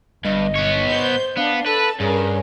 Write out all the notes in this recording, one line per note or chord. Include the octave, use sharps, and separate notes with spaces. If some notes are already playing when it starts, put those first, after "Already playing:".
G1 G2 D#5
B3 C#5
C5 G6
B3 D4 F5
A4 B4 A5
G2 C#4 G#4 A#4